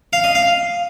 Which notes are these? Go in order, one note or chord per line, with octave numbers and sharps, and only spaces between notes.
F5
D#5
F5